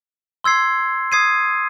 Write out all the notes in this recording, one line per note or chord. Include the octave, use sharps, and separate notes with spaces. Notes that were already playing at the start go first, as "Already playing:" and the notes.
C6 E6 G#6 C7
D#6 G#6 C7 D#7